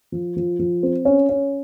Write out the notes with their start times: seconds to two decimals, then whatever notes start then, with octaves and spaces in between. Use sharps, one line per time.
0.12 F3
0.37 F3
0.59 F3
0.83 C4
1.05 C#4
1.29 C#4